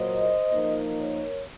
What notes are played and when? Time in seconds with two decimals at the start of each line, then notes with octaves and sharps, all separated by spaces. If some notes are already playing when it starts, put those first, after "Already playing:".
Already playing: A#2 F#3 A#3 C5 D#5
0.52 F3 A#3 D#4
0.97 A#4 C#5